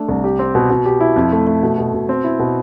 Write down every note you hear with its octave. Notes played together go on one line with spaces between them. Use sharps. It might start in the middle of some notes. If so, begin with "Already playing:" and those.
Already playing: A3 D4
C2
G4
C4
B2
B2
G4
E4
F2
A3
A3
B2
B2
B2
C4
E4
B2